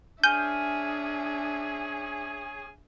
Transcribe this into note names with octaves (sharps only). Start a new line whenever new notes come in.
C#4 D4 G#4 E5 G#5 F6 G6 D#7